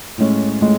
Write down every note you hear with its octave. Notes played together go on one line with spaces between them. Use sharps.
A2 G#3 C#4
A2 G#3